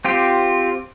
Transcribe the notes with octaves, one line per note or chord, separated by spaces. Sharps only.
C4 F4 G4